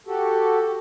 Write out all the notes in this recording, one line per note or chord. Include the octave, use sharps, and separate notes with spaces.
F#4 G4 A4